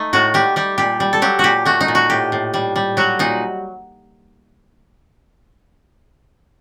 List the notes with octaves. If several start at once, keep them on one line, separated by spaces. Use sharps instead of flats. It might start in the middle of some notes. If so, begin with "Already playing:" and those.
Already playing: A3 D#4
A2 F#4
G3 G4
G3 G4
A#2 G4
G3
A4
F#3 G4
A#2 F#4 G4
A3 F#4
D#4
A#2
F#4
A2 G4
A2
G3
G3
F#3 F#4
A#2 D#4